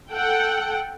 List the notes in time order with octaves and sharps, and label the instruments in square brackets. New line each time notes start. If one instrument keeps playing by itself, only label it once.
[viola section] A4 F#5 G5